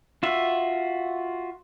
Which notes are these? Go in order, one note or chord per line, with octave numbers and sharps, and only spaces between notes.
F4 F#4 E5